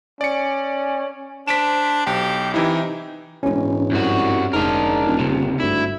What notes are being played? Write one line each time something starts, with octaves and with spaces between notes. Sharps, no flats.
C#4 D5 C#7
D4 C5 B6 D7 E7
B1 G4
C3 E3 D#4 E4 G4
E1 A#1 G#2 C#4
C2 G2 F#4
F1 D2 G#2 D4 A#4
D#1
C#2 C3
G#1 D2 G2 E4